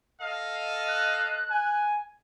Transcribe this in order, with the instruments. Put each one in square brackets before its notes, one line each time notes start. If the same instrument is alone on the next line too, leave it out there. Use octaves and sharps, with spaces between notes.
[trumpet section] A4 D#5 F5
[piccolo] F#6
[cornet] G#5